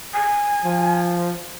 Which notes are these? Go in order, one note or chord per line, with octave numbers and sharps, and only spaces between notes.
G#5
F3